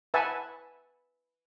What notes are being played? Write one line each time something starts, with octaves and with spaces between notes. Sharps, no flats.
B4 E5 F#5 G#5 A5